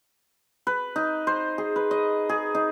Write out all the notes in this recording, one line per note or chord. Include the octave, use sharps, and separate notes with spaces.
B4
D#4
C5
G#4
B4
D#5
G#4
D#4